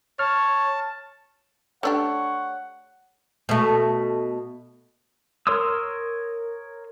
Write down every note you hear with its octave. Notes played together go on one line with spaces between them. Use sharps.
C#5 A5 F6
A3 D4 G4 C#5 F#5
B2 A3
A#4 C#5 C6 D#6 E6